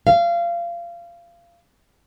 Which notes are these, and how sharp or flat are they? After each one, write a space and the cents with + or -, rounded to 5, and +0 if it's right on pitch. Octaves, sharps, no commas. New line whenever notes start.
F5 -25